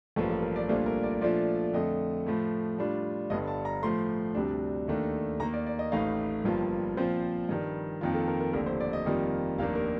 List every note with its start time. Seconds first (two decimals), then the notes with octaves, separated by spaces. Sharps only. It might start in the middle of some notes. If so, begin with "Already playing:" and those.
0.16 A1 G2 F3 A#3 A4
0.30 A4
0.43 A#4
0.56 D5
0.69 C2 A#2 A3 D4 F4 C5
0.86 A#4
1.03 D5
1.21 A#2 F3 A3 D4 F4 D5
1.73 F2 D3 A3 D#5
2.26 A2 F3 A3
2.78 A2 G3 D4 F4
3.30 G1 G2 D3 D#5
3.48 A5
3.65 A#5
3.82 A2 F3 A3 C6
4.35 D2 C3 G3 D4
4.88 D#2 D#3 A3 D4
5.39 D#2 D#3 A#3 A#5
5.53 D5
5.66 D5
5.79 D#5
5.92 A1 A2 A3 D#4 F5
6.44 G1 G2 F3 A#3 F4
6.96 A#2 F3 C4 F4 C5
7.49 G2 D#3 G3
8.01 F2 D#3 A#3 F4
8.14 A4
8.28 A#4
8.40 A#4
8.53 F1 D#2 D3 A#4
8.66 C5
8.80 D5
8.93 D#5
9.06 F2 D#3 G3 A#3 F4
9.58 F1 D#2 D#3 A#3 D4 F5
9.75 A#4